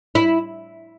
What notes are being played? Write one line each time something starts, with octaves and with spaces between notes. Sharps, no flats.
E4